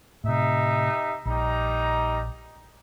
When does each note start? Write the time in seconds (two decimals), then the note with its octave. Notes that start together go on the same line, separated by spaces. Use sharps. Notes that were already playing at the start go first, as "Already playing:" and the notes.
0.24 A2 C3 D#4 G4 E5
1.25 A#1 G3 D#4 A#5